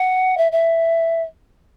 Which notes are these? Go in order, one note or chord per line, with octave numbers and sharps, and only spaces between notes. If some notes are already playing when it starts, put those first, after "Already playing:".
Already playing: F#5
E5
E5